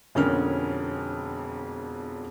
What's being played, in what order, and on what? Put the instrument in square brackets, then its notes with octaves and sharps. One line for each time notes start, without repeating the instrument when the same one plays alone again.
[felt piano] E1 F2 D3 C#4 A#4 F6